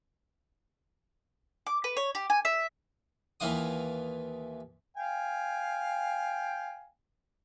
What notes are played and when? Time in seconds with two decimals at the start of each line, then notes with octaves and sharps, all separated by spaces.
1.67 D6
1.84 B4
1.97 C#5
2.15 G4
2.30 G#5
2.45 E5
3.40 D#2 E3 E4 F4 F#5 D#6
4.97 F5 G5 G#5